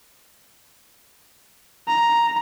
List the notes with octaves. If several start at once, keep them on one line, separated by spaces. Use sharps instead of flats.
A#5